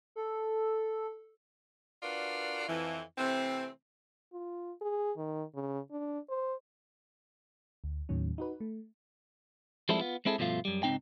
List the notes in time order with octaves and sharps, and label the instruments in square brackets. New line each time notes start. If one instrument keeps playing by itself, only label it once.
[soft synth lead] A4
[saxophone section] D4 F4 F#4 A#4 B4 D5
F2 E3
C3 E3 A3 C4
[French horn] F4
G#4
D#3
C#3
D4
C5
[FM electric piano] D2
D#2 A2 D#3 F#3 C#4
D#4 F#4 B4
A3
[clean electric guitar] F3 G3 G#3 C4 E4 A4
B3 F4
G#3 C4 E4 G#4 A4
G2 B2 F3 A3 F4
F#2 G3
C#2 G#2 F#3 C4 D#4 G5